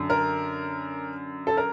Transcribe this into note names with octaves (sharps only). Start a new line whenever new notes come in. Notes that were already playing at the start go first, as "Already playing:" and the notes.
Already playing: F#2 D3
A#4
A4
A#4